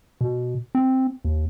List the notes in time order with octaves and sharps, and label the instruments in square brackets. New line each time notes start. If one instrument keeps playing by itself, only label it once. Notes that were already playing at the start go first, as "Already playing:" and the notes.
[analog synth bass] B2
C4
D#2